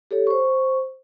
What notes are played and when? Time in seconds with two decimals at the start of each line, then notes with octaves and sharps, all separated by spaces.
0.11 G4 A4 C#5
0.27 C5 C#6